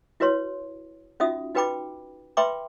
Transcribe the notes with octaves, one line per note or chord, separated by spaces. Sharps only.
E4 F#4 B4 C#5 C6
C#4 D#4 F4 F#4 E5 D#6
D#4 F#4 B4 G5 B5 D6
B4 E5 G5 B5 C6 D6